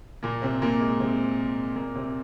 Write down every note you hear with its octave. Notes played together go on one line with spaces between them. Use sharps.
A#2 A#3
C3 C4
A#2 A#3
G#2 G#3
C3 C4
A#2 A#3
C3 C4